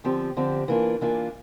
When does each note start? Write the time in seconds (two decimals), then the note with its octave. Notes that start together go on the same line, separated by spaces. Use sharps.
0.04 D3 F3 C4 G4
0.37 D3 F3 C4 G4
0.68 E3 A#3 D4 F4
1.01 E3 A#3 D4 F4